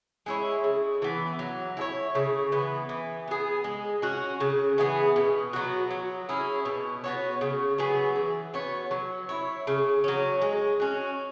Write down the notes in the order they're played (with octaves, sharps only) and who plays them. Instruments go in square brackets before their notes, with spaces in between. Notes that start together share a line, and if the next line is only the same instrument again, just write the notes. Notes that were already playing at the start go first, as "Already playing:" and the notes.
[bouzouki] G#3 E4 C#5
C#3
E3 B3
F#3
E4 G#4
C#5
C#3
E3 B3
E3
B3 G#4
G#3
C#4 F#4
C#3
E3 B3 G#4
B2
F#3 B3 F#4
F#3
C#4 E4 G#4
B2
B3 F#4 C#5
C#3
F#3 B3 G#4
E3
B3 F#4 C#5
F#3
E4 C#5
C#3
F#3 C#4
G#3
C#4 F#4